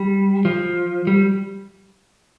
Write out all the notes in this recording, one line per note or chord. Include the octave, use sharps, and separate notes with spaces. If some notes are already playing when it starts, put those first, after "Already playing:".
Already playing: G3
F3
G3